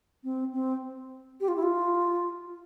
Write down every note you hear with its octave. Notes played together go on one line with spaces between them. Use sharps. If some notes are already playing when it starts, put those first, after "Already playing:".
C4
C4
G4
F4
E4
F4